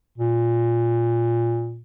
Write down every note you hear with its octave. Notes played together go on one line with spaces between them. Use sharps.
A#2